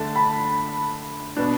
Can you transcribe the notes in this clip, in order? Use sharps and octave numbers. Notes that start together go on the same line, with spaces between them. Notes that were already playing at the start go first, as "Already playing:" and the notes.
Already playing: D3 A3 D4 A5
B5
B2 B3 D4